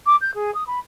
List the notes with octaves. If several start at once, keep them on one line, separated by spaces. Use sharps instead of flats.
D6
G6
G#4
D#6
B5